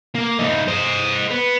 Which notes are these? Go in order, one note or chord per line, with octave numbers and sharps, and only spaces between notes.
A#3
F3 D#4
C5 D#5
B3